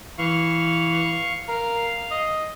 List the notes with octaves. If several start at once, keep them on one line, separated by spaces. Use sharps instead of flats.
E3 F5 C#6
A#4 F5
D#5